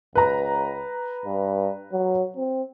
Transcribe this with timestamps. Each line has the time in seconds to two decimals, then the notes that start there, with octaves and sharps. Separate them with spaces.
0.15 C#2 B4 A#5
1.25 G2
1.92 F#3
2.37 C4